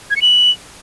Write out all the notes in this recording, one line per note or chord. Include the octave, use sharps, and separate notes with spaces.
G#6
C#7
F#7